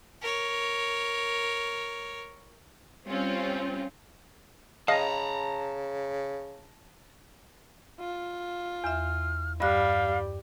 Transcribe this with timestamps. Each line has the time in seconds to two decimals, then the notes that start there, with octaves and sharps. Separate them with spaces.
0.22 A#4 C#5
3.07 G3 C4 C#4 F4
4.88 C#3 D#5 F5 A5 A#5
8.00 F4
8.84 E2 E5 F6
9.60 G2 G3 F5 F#6